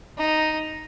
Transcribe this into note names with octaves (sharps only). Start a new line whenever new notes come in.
D#4